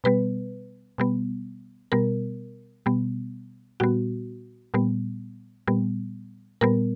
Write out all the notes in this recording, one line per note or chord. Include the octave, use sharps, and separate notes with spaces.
B2 G3 B3 B4
B2 G3 B3
B2 G3 B3 A#4
B2 G3 B3
A#2 G3 B3 F#4
A#2 G3 B3
A#2 G3 B3
A#2 G3 B3 A#4